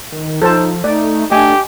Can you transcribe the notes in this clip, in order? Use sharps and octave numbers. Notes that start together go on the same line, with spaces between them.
D#3
F3 D#4 A4 C5 A5
A3 D#4 D5
A3 D4 G4 D#5 G#5